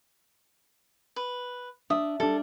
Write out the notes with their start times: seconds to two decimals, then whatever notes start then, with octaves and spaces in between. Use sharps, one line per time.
1.16 B4
1.90 D4 E5 D#6
2.20 G3 D4 A4